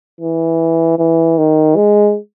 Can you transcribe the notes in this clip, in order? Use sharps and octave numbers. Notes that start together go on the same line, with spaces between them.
E3
E3
D#3
G#3